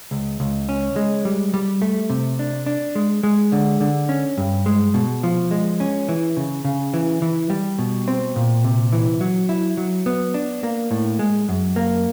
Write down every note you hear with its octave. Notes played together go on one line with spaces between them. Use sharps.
C#2
C#2
C#4
G#3
G3
G3
A3
C3
D4
D4
G#3
G#3
D3
D3
C#4
G2
G#3
B2
F3
G#3
C#4
E3
C#3
C#3
E3
E3
G3
B2
C4
A#2
C3
E3
F#3
E4
F#3
B3
D4
A#3
A2
G#3
F#2
A#3